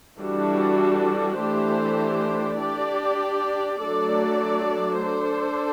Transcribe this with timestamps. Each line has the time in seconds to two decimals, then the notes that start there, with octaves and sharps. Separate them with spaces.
0.17 E3 G3 D4 F#4 A4
1.38 E3 A3 D4 G4 C5
2.60 D4 G4 D5
3.80 F#3 A3 D4 A4 D5
5.02 D4 A4 C5